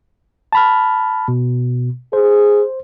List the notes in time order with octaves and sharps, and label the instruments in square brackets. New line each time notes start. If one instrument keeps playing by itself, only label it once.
[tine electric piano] A5 B5 F6
B2
[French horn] G#4 [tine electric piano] C5